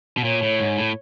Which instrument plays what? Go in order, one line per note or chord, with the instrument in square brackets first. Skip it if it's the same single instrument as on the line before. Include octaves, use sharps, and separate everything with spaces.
[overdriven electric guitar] B2
[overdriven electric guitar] A#2 [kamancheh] C#5
[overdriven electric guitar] A2
G#2
A2